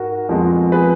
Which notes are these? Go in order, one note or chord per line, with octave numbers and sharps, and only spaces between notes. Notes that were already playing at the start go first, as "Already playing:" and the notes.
Already playing: G#2 F#4 A#4
F2 F3 G#3 B3
G#4 B4